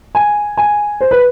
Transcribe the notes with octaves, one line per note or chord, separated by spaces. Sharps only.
G#5
G#5
C5
B4